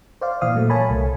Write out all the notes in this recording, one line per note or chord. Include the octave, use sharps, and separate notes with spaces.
C5 D5 F5
A#2 E3 F5 D#6
A#2 F#3 A3
A#4 C#5 G#5 A5 B5
C2 A3